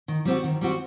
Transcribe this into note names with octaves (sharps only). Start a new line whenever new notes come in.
D#3
G3 C4 F#4
D#3
G3 C4 F#4